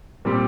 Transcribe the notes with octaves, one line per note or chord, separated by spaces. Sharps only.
A#2 G3 C4 G4